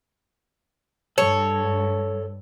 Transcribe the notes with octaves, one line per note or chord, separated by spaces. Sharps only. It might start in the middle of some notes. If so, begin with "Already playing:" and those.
G2 A4 C#5